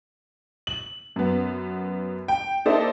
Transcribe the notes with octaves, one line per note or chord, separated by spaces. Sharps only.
F#7
F#2 B3
G5
A#3 D#4 A4 C5 D5 E5